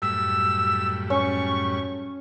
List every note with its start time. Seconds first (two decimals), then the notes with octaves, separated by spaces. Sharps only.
0.02 F#2 A2 G3 E6
1.10 C#4 C#6